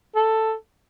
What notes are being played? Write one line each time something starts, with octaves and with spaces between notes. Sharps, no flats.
A4